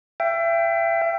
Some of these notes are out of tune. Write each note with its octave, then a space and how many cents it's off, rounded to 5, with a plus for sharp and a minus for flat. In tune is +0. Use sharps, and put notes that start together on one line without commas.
E5 +30 G5 +0